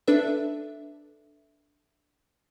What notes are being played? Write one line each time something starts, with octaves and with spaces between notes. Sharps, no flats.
D4 A4 B4 E5